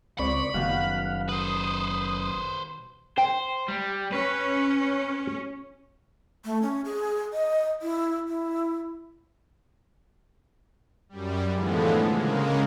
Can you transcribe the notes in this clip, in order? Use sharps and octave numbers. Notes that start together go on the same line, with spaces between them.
C#2 C4 D5 B5 C#6
F#1 B2 D#3 G3 F5 F#5
B4 C5 D#6
C5 G5
G3
C#4 B4
A3
C#4
G#4
D#5
E4
E4
F#2 G3
A2 D3 E3 F3 G#3 B3
C#3 G#3 A#3